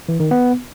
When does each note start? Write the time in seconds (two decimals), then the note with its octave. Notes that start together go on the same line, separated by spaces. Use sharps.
0.09 E3
0.20 D#3
0.31 B3